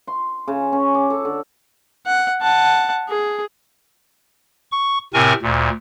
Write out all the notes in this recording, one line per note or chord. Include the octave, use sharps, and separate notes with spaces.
C6
C#3
C#4
D6
A4
D3
F#5
F#5 A5
G#4
C#6
A2 C3 C4 A#4 G#5 C#6
D2 A#2